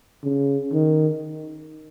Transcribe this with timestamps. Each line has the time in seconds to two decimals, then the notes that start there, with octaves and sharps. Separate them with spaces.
0.24 C#3
0.73 D#3